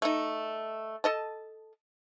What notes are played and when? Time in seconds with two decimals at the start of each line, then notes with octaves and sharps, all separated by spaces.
0.02 A3 D#4
1.04 A4 D#5 A5